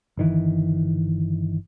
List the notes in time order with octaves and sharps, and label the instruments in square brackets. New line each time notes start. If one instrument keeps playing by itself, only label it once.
[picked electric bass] G1 D#3 E3